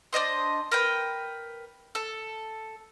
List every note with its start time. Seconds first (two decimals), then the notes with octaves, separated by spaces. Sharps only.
0.13 D4 C5 D#5 C6
0.72 A#4 B4 G5
1.95 A4